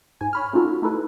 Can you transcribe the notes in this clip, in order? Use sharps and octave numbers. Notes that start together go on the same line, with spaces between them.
G#2 G#5
C#5 B5 F6
A3 C#4 D#4 F4 F#4 A4
A3 D#4 E4 A4 B4